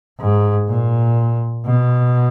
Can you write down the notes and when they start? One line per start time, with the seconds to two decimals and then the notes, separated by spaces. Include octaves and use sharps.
0.20 G#2
0.69 A#2
1.66 B2